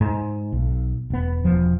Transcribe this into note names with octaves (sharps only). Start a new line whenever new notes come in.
G#2
B1
E1 B3
E1 F3